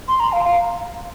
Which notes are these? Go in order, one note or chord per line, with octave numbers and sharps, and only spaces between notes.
C6
A#5
F5
F5